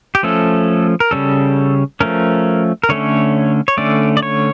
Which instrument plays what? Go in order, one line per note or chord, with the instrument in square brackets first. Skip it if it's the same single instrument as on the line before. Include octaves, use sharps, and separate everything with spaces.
[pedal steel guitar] G4
F3 A3 C#4 A4
A#4
C#3 G3 C#4 A4
F3 A3 C#4 A#4
A#4
D3 A3 C#4 C#5
C#5
D3 A3 C#4 D5
D5
C#5